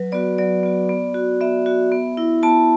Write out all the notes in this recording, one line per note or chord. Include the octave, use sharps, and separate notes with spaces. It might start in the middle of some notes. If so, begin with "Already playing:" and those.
Already playing: F#3 B4
B3 F#4 D5
F#3 D5
B3 F#4
B3
F#4
B3 E5
F#4
B3
E4
B3 A5